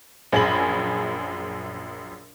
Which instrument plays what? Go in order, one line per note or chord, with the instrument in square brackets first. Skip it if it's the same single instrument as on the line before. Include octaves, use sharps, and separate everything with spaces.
[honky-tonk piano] A#1 F#2 G#4 B5 A#6 F#7